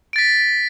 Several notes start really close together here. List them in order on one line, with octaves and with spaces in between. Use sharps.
D7 A6 B6